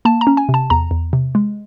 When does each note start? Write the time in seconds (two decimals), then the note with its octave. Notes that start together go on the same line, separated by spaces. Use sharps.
0.05 A#3 A5
0.21 A#5
0.27 C#4
0.37 G#5
0.49 C3
0.54 A5
0.70 E2 A#5
0.91 E2
1.13 C3
1.35 G#3